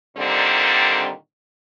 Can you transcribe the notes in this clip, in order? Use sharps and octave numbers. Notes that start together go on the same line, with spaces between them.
A#2 D3 D#3 G3 C4